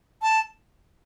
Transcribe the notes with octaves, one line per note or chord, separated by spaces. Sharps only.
A5